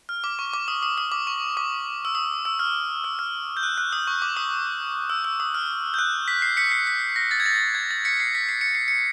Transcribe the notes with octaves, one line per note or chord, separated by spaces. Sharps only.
F6
D6
C#6
D6
D#6
D#6
D#6
D6
C#6
D6
E6
D#6
E6
F6
E6
F6
G6
F#6
F#6
D#6
C#6
D6
D#6
E6
E6
D#6
F6
G6
F#6
B6
C7
B6 C#7
C7
B6
A#6
A6
G#6
A6
G#6
A6
B6 C#7
C7
B6
C7
C#7
C7
C#7